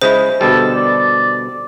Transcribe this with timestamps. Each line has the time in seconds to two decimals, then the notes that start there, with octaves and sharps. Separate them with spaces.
0.02 C#3 G#3 E4 C5
0.41 B2 D3 G3 A4
0.75 D5